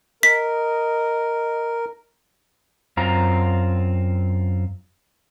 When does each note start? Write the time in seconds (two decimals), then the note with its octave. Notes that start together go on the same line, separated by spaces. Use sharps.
0.23 A#4 D#5 B6
2.97 F#2 C4 F4 A#5